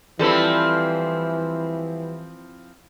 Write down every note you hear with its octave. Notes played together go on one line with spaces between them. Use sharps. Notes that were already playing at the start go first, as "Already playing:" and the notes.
E3 F3 G3 C4 E4 A4 B4